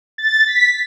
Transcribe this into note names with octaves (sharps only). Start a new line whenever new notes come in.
A6
B6